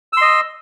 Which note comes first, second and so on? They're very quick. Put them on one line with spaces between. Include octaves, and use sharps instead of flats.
E6 C6 D#5